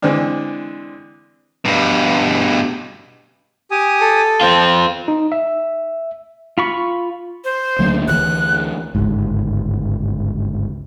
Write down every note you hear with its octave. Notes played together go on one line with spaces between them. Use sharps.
D3 E3 G#3 C4 D4
G2 B2
G4 G#5 D#6
A4
C4 F4 G5
D#4
E5
F4 B5 C#6
C5
D2 F#3 A#3
A1 D2 E3 F#6
G1 C#2 G#2